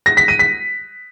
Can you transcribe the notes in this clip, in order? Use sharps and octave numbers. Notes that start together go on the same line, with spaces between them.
A#6
B6
D#7
B6